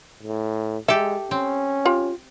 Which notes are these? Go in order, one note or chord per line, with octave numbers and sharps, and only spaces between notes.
A2
G#3 G4 A4 E5
C4 C#4
F4 G4